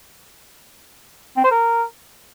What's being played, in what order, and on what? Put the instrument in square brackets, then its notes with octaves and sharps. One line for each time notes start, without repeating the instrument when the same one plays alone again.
[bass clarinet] C4
C5
A#4